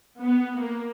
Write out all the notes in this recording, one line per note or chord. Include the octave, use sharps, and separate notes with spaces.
B3
A#3